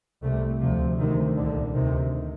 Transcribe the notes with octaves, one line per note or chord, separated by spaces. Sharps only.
C2 C3 A3
D2 C3 F3
D2 C3 D#3
C2 A#2 D3
D2 C3 D#3